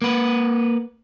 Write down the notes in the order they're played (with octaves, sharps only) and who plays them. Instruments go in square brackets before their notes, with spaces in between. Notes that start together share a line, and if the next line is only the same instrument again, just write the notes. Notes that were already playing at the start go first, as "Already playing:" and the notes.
[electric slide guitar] A#3 B4